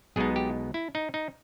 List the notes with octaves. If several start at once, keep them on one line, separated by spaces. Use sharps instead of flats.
B1 B2 G#3 B3 D#4 G#4
G4
E4
D#4
D#4